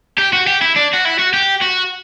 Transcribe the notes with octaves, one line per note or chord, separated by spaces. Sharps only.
G4
F#4
G4
E4
D4
F#4
E4
F#4
G4
F#4